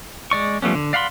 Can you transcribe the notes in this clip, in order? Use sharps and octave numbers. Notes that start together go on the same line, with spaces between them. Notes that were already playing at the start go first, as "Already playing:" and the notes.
G#3 D5 C#6
F3 G3 A3 B3 C#4
D3
D5 F5 F#5 B5 C6